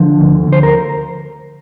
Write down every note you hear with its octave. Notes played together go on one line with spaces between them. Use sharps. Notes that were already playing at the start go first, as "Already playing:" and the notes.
Already playing: D3 F3
D2
D2
C5
A#4